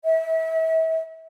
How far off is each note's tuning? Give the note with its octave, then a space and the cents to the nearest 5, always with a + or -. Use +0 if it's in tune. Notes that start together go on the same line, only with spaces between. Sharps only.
E5 -35